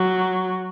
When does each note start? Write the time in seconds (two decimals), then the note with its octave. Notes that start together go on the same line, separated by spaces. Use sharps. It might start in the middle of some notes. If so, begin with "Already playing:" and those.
Already playing: F#3